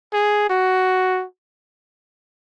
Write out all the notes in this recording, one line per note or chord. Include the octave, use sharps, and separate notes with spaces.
G#4
F#4